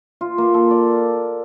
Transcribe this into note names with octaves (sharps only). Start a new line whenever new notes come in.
F4
A#3
A4
D5